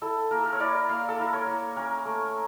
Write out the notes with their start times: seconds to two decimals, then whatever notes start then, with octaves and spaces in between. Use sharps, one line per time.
0.02 E4 A4
0.31 A#3 A#4
0.39 A4
0.45 A#4
0.53 C#5
0.60 E4 D5
0.89 A#3 F5
1.09 A4
1.18 E4 A#4
1.33 C#5
1.47 A#3
1.76 C#4 A#4
2.05 A3